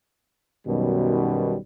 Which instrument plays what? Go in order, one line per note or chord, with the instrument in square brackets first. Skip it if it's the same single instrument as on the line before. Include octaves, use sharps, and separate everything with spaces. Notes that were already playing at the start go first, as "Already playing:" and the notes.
[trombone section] B1 F#2 B2 D#3 G3